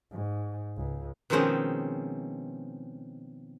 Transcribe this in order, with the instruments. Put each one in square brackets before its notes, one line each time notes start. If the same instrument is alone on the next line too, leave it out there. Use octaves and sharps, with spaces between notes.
[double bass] G#2
C#2
[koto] B2 D#3 F3 G#3 C4 C#4